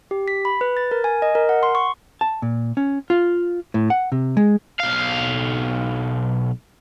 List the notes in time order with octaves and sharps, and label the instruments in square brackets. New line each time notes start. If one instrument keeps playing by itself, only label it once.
[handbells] G4
B6
B5
B4
A6
A#4
G#5
D#5
A#4
F#5
C6
C#6
[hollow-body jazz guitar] A5
A#2
C#4
F4
A2
F#5
C3
G#3
[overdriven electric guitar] B1 F5